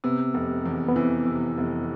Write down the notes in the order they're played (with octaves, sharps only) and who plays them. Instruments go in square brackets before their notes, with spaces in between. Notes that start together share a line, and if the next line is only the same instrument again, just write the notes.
[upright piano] C3 [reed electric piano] B3
[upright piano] F1
E2
[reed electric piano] B3
[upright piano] E3 [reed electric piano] C4
[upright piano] C3
F1